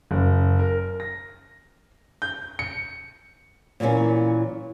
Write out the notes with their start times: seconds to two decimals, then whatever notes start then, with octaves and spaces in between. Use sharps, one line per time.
0.11 F#1
0.59 A#4
1.00 A#6
2.22 G6
2.59 C#7
3.80 A#2 E3 F#3 G3 A#3 C#4